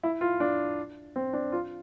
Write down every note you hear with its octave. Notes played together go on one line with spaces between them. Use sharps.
E4
F4
D4
C4
D4
F4